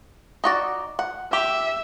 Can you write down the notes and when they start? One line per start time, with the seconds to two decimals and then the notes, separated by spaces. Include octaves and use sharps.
0.44 D#4 F#4 D5
0.99 F#5
1.33 G4 E5